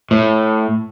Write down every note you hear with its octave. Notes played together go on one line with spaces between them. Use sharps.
A2